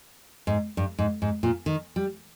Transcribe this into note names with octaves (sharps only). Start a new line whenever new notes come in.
G#2
G2
G#2
G#2
A#2
D#3
G3